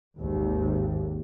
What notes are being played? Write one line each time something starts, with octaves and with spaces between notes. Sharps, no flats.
G#1 D#2